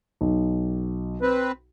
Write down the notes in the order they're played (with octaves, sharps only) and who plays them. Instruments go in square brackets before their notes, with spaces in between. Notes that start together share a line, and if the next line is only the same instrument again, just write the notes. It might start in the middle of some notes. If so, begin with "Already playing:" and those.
[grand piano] B1
[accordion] C4 B4